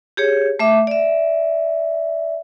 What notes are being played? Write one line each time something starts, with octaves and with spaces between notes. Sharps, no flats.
G4 G#4 C#5
A3 E5 D6
D5 E5